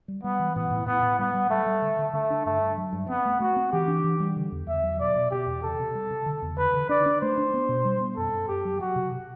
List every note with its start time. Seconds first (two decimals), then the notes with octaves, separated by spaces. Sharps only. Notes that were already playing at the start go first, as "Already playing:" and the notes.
0.08 G3
0.23 G3 B3
0.39 E3
0.56 A2 B3
0.71 A2
0.87 A2 B3
1.02 A2
1.19 G3 B3
1.34 G3
1.50 G3 A3
1.66 G3
1.82 D3
1.99 D3
2.13 D3 A3
2.30 D4
2.45 G2 A3
2.62 G2
2.78 F#3
2.93 G2
3.10 B3 C4
3.25 A3
3.40 A3 F#4
3.56 C4
3.72 E3 G4
3.88 D4
4.04 E3
4.20 G3
4.37 D3
4.52 E2
4.68 E2 E5
4.83 F#3
4.99 B2 D5
5.16 B2
5.31 B2 G4
5.46 E2
5.63 C3 A4
5.79 C3
5.95 G3
6.10 C3
6.26 D3
6.42 E2
6.58 D3 B4
6.74 D3
6.89 D4 D5
7.06 D4
7.21 A3 C5
7.38 D4
7.54 B3
7.69 B2
7.85 G3
8.01 B3
8.16 F#2 A4
8.33 F#2
8.48 F#2 G4
8.65 F#3
8.80 F#3 F#4
8.96 C3
9.12 C3